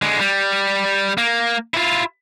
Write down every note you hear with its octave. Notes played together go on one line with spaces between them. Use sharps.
D3 G#3
G3
A#3
E4 F4